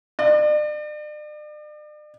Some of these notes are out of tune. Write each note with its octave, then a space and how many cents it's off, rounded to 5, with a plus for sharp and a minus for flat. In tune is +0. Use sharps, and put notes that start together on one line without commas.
D5 +40